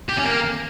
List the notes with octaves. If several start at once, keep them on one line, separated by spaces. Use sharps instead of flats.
G4
C#4
A#3